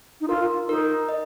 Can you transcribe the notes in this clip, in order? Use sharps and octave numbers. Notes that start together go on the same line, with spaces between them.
D#4
F4 A#4
D#4 A#4
D#5